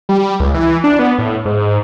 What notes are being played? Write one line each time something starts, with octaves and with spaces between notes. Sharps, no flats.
G3
C#2
E3
D4
B3
A2
G#2